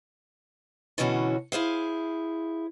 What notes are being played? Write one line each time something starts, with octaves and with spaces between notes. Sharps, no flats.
B2 D3 E3 F#3 C#4 F#4
E4 G#4 C5 F5